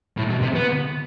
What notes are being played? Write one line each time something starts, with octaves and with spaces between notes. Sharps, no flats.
A2
B2
C3
B3